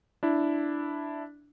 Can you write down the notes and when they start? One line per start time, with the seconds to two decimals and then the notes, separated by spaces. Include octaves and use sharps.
0.23 D4 E4